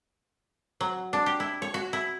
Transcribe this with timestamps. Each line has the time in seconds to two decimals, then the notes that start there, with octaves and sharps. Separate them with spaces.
0.81 F#3
1.13 D4
1.26 G4
1.40 E4
1.62 C#5
1.74 F#4
1.93 E4